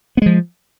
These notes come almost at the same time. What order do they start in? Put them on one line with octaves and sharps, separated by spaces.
B3 G#3 F3